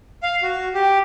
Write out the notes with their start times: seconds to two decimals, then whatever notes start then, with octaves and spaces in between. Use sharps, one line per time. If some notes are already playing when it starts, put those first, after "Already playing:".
0.23 F5
0.43 F#4
0.74 G4